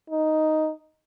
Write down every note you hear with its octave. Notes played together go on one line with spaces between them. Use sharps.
D#4